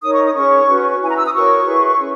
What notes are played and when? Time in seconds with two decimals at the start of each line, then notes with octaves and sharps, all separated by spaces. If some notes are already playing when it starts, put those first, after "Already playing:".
0.03 D#4 A#4 C#5 D#6
0.13 C#6
0.25 D#6
0.35 C#4 G#4 C#5 C#6
0.68 C#4 F#4 B4
1.01 E4 B4 G#5
1.09 A#5
1.17 E6
1.26 D#6
1.33 F#4 A#4 C#5 C#6
1.67 E4 G#4 B4
2.00 C#4